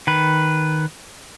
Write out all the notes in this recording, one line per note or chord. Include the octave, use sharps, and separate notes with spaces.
D#3 B4